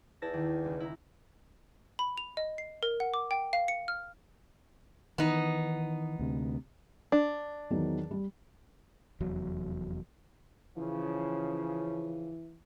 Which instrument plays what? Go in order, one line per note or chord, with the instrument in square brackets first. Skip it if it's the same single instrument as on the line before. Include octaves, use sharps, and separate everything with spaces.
[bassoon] E2 [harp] E4 A5 A#6
[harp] D#2 D#3
C#2
E4 A#5
[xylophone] B5
F7
D#5
C7
A#4
F#5
D6
G5
F5
C#7
F6
[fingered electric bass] D#3 E3 [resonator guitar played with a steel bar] B3 D#4
[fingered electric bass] D2 C3
[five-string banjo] D4
[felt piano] E2 D#3 F#3
G3
[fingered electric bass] F1 E2 F#3
[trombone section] C#3 F3 [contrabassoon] E3